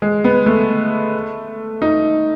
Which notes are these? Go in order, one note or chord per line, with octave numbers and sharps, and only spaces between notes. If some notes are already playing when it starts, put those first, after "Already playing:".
G#3
B3
A3
D#4